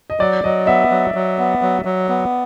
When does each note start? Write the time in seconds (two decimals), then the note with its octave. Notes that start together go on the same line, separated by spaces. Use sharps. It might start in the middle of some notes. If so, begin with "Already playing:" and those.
0.10 D#5
0.20 F#3 D5
0.44 F#3 D#5
0.67 B3 E5
0.91 F#3
1.14 F#3
1.39 B3
1.62 F#3
1.85 F#3
2.09 B3